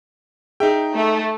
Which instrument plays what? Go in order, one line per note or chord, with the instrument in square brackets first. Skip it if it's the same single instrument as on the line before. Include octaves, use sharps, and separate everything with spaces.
[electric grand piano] D#4 E5 G5 [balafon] G#4
[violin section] A3